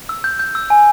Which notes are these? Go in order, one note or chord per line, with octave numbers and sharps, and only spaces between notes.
E6
G6
G6
E6
G#5